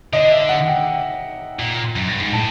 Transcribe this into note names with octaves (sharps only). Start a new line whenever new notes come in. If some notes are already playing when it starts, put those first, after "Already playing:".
D3 D#5
E5
F#5
G5
A#2
F#2
G2
G#2
A2 A5